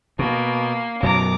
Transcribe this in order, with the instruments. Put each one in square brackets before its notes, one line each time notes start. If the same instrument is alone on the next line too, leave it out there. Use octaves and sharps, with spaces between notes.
[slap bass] B2 [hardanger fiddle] A#3
[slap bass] F#2 B2 F#3 [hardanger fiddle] A#5 D6